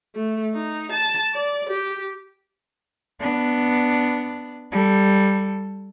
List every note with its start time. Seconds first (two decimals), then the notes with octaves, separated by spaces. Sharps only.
0.15 A3
0.54 D#4
0.92 A5
1.34 D5
1.69 G4
3.21 B3 D4
4.71 G3 A4